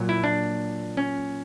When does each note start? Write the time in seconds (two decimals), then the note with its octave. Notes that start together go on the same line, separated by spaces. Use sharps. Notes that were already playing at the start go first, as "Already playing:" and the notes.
Already playing: A#2 F#3
0.09 E4
0.24 D4
0.97 C#4